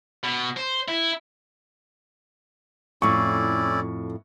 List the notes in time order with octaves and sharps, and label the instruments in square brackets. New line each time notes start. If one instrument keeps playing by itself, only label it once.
[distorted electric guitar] B2
C5
E4
[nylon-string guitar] F2 A2 [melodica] C#4 E4 D5 [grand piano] C#6